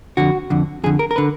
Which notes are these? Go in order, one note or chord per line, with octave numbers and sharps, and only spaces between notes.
F2 D3 F#4
F2 D3
F2 D3 G#4
A#4
A#4
D3 B4